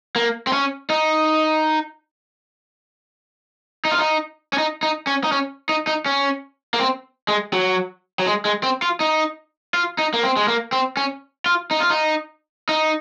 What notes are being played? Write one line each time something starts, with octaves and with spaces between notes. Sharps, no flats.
A#3
C4
C#4
D#4
D#4
F4
D#4
C#4
D#4
D#4
C#4
D#4
C#4
D#4
D#4
C#4
A#3
C4
G#3
F#3
F#3
G#3
G#3
C4
F4
D#4
F4
D#4
A#3
C4
G#3
A#3
C4
C#4
F4
D#4
F4
D#4
D#4